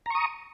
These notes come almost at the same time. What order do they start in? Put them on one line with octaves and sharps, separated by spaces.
A#5 C#6 D#6